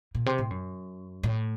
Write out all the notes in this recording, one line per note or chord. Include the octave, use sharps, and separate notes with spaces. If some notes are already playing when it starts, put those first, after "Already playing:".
A#2
C3
A2
F#2
A2